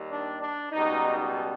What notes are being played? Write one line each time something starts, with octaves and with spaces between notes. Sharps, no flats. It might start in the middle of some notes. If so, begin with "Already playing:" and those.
Already playing: D#2 D#3 G3
D4
D4
C#2 B2 G3 D#4